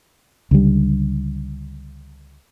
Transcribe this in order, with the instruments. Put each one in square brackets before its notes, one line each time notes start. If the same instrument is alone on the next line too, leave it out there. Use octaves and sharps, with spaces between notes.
[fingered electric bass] C#2 D3 G3